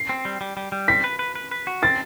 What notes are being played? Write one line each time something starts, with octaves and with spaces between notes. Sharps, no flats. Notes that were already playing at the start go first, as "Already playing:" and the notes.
Already playing: C7
C4
G3
G3
G3
G3
C4 B6
B4
B4
B4
B4
F#4
C4 A6